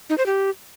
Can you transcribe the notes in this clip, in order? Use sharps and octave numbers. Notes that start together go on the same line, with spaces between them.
D#4
C5
G4